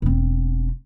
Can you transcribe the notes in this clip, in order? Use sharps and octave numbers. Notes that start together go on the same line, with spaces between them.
E1 C4